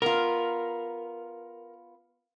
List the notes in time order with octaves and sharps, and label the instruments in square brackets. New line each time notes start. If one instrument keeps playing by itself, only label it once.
[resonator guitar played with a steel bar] B3 F4 [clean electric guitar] A#4